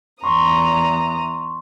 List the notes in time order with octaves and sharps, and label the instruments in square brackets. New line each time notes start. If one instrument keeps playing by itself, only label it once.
[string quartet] E2 A#5 D#6 [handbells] C6 C#6